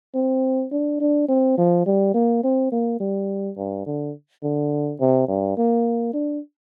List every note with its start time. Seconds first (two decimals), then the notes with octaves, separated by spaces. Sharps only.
0.15 C4
0.72 D4
1.00 D4
1.29 C4
1.58 F3
1.86 G3
2.14 A#3
2.44 C4
2.72 A#3
3.00 G3
3.57 G2
3.86 D3
4.43 D3
5.00 C3
5.28 G2
5.57 A#3
6.14 D4